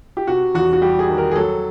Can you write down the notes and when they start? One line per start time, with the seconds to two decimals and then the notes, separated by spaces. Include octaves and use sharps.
0.17 G4
0.27 C3 F#4
0.55 E2 F#4
0.73 F#4
0.81 G3 G4
0.99 G#4
1.08 D#3
1.18 A#4
1.31 G#4
1.36 F#3 A4